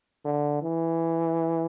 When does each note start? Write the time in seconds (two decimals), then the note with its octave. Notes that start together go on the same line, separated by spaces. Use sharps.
0.25 D3
0.62 E3